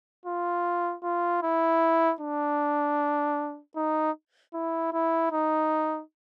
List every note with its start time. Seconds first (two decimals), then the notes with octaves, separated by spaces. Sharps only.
0.26 F4
1.03 F4
1.43 E4
2.21 D4
3.76 D#4
4.54 E4
4.93 E4
5.32 D#4